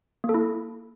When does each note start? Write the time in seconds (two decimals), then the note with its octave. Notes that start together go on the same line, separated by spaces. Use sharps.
0.24 A#3
0.29 A4
0.34 E4